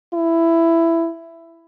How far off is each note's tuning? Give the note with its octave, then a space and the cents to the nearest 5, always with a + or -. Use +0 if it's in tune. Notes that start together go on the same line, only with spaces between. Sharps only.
E4 +10